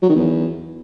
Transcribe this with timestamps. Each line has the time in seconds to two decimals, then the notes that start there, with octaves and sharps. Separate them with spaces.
0.02 F#3
0.09 D#3
0.15 E2